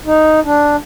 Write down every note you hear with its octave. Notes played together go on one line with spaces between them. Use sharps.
D#4
D4